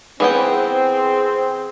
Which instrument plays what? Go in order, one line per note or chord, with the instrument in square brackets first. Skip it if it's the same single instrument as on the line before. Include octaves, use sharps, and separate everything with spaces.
[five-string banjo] E3 B3 G5 [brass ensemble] C4 [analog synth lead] G#4